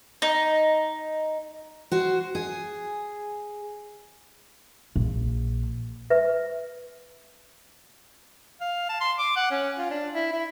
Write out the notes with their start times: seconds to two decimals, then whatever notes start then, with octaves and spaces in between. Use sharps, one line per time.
0.22 D#4
1.92 F#4 C5
2.35 G#4
4.96 A#1
6.10 B4 E5
8.61 F5
8.89 A5
9.01 C6
9.19 D6
9.36 F#5
9.51 C#4
9.79 F4
9.91 D4
10.13 E4
10.32 E4